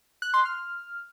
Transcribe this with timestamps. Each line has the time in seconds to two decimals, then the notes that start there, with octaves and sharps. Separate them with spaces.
0.22 F#6
0.34 C6
0.45 F6